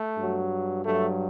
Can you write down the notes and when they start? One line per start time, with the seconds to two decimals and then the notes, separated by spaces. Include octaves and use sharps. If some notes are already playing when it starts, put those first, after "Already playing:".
Already playing: A3
0.17 G2 F#3
0.84 G2 F#3 A3